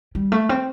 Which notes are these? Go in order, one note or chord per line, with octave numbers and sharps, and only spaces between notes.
G3
A3
C4